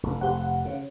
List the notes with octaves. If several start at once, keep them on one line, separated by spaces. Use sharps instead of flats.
F1
F1 G4 C5 F#5
C#3